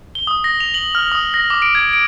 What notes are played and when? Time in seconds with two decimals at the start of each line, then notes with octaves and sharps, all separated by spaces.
0.15 G7
0.27 D#6
0.44 A#6
0.60 F7
0.74 F#7
0.95 F6
1.12 D#6
1.34 A#6
1.50 D6
1.62 D7
1.75 G#6
1.93 D7